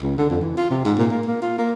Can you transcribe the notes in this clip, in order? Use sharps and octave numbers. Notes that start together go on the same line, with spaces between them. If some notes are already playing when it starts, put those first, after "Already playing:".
C#2
D3
F2
E3
F4
C3
G#2
A#2
A#3
A#3
F4
A#3